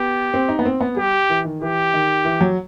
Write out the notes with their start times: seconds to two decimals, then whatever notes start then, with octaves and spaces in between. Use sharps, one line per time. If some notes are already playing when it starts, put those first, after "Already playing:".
Already playing: B3 G4
0.34 C4
0.49 D#4
0.59 B3
0.65 C4
0.81 B3
0.97 G3 G4
1.30 E3
1.45 D#3
1.61 E3 G4
1.94 D#3
2.25 E3
2.41 F#3